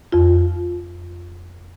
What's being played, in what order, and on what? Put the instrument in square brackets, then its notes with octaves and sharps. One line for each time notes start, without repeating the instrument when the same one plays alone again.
[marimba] F2 F4